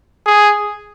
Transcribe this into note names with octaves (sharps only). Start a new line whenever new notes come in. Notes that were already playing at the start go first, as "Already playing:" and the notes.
G#4